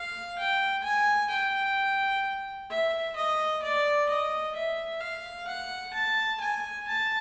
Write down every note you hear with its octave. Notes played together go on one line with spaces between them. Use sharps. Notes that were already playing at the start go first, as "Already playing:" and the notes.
Already playing: F5
G5
G#5
G5
E5
D#5
D5
D#5
E5
F5
F#5
A5
G#5
A5